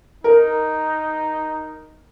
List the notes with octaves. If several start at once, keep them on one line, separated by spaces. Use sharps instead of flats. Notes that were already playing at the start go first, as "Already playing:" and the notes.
D#4 A#4